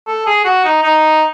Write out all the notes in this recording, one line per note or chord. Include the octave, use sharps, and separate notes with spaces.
A4
G#4
F#4
D#4
D#4